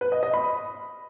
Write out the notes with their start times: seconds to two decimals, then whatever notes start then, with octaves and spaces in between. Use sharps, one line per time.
0.01 B4
0.12 D#5
0.23 D#5
0.34 B5